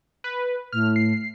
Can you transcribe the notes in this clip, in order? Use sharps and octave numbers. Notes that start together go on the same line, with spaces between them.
B4
A2 F6
C7